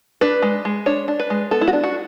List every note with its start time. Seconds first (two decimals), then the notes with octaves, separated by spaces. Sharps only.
0.21 D4 B4
0.42 G#3
0.65 G#3
0.86 D4 C#5
1.08 D4
1.20 B4
1.30 G#3
1.51 B3 A4
1.61 E4
1.68 F#4
1.73 D4
1.84 F#4